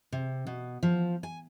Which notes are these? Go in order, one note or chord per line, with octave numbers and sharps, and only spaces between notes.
C3
B2
F3
G#5